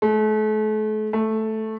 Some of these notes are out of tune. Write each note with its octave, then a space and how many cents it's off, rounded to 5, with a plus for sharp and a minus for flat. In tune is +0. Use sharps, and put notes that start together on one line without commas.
A3 -40
A3 -5